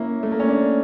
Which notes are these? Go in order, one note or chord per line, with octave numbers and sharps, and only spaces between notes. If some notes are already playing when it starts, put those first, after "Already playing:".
Already playing: A#3 C#4 E4
A3
A#3
C#4
D4